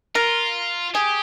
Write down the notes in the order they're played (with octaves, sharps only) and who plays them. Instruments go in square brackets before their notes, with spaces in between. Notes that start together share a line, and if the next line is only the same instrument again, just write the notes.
[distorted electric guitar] F4 [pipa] A#4
[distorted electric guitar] G4 [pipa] G#4